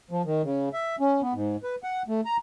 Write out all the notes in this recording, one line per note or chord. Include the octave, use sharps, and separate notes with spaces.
F3
D#3
C#3
E5
C#4
B3
G#2
B4
F#5
A3
A#5